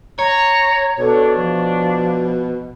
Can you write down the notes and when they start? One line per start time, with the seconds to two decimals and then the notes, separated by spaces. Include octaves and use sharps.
0.19 C#5 A#5
0.99 B2 D4 A4
1.36 F3